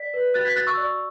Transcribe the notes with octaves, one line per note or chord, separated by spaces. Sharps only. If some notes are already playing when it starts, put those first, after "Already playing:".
Already playing: D5 B6
B4
F#4 F#6 A6
G#6 B6
F#4 F#6 A6
C#6 E6
D5